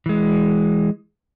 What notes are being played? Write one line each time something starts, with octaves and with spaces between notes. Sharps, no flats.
E3 G#3